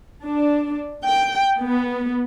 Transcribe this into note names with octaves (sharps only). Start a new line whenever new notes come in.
D4
G5
B3